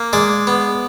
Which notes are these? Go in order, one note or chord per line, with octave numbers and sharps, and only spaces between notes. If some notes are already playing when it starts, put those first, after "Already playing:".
Already playing: A#3
G#3 D5
B3